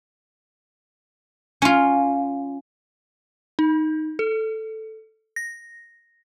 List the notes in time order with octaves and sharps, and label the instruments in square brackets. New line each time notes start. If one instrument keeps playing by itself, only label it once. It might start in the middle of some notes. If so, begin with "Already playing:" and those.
[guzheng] C#4 F4
[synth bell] D#4
A4
A#6